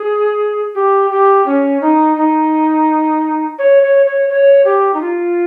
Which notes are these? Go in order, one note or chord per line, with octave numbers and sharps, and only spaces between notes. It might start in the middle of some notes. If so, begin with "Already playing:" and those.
Already playing: G#4
G4
G4
C#4
D#4
D#4
C#5
C#5
C#5
C#5
G4
D#4
F4